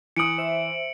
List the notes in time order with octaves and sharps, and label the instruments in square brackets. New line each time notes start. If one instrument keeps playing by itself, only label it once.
[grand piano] E3 D#6 [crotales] C#7 D7 F#7
[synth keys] C5 E5